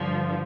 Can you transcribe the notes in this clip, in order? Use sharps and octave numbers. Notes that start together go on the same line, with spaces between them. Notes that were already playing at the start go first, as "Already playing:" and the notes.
Already playing: G2 D3 F3